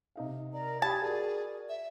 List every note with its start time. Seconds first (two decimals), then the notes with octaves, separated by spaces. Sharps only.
0.16 C3 D#4 F5
0.53 A#4 D5 A#5
0.82 G4 G#5 A5 B5 D#6 G#6
1.02 F#4 G#4 A#4 D5
1.69 E5